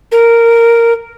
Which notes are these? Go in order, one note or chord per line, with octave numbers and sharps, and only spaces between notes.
A#4